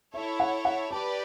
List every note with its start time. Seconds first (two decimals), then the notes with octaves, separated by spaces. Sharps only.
0.14 E4 A4 C#5 E5
0.40 F#5
0.65 F#5
0.91 G4 B4 D5 A5